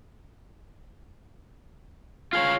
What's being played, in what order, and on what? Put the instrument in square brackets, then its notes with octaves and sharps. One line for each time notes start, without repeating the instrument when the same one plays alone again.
[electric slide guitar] F4 G#4 C#5 [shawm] F5